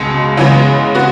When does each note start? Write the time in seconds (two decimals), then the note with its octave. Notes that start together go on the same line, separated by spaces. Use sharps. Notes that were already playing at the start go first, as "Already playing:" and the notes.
Already playing: C#2 B2 G#3
0.37 C#3 E3 G#3 B3
0.95 B3 F#4